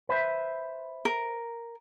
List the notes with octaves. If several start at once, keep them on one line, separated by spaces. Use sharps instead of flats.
B4 C5 E5
A#4